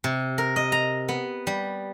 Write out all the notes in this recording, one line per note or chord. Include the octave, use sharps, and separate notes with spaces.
C3
A#4
D#5
A#5
B3
G3